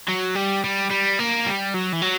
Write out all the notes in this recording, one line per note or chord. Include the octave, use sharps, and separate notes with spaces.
F#3
G3
G3
G3
A#3
G3
F#3
E3
F#3